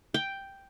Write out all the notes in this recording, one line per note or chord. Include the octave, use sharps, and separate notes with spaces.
G5